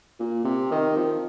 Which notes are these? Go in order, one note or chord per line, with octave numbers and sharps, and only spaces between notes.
A#2
C3
D#3
F3